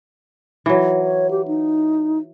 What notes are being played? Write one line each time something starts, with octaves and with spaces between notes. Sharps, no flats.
E3 F#3
C#5
G4
D#4